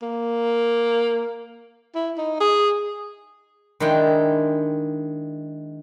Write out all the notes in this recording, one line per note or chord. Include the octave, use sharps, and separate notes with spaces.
A#3
E4
D#4
G#4
D#3 G#3 D4 E4 G5